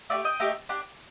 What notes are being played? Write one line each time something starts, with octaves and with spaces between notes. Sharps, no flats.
A3 D#4 G4 D5 F5
D#5 G5
A3 D#4 G4
D4 G4